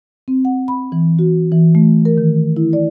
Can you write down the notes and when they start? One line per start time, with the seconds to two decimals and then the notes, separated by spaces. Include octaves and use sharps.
0.28 C4
0.45 F#5
0.68 B5
0.92 E3
1.19 F#4
1.52 E3
1.75 A3
2.05 A#4
2.18 D#3
2.57 E4
2.73 D5